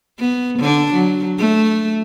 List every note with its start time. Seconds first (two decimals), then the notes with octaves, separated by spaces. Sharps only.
0.19 B3
0.59 D3 D4
0.94 F#3
1.38 A3